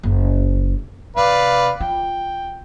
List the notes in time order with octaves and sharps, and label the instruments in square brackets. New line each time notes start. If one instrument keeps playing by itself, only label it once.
[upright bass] F#1
[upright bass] C3 [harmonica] B4 D5 F5
[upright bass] F4 [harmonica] G5